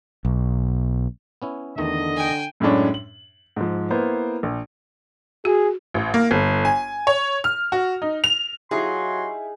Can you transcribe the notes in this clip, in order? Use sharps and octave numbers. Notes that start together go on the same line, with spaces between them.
B1
B3 C#4 E4
E2 D3 D#3 A3 D#5
G5 G#5
F#2 A2 G#3 C#4 D4
F#7
G#2 F3
A#3 B3 E4 C5
A#1
F#4 G#4
A1
A#3
G1
G#5
C#5
F6
F#4
D#4
F7
F#3 D#4 E4 G4 G#4 F5 C6